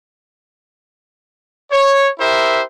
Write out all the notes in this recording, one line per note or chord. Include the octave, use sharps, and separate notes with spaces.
C#5
E4 G4 A#4 C5 E5